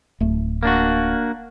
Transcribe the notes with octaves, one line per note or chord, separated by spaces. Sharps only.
D1 A3
A#3 D4 F#4